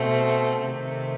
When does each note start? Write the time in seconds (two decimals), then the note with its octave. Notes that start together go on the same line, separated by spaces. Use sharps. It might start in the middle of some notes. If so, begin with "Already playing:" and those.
Already playing: B2 A3 C4
0.64 C3 D#3 A3 C4